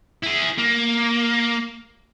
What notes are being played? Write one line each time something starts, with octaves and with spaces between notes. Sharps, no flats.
E4 G#4
A#3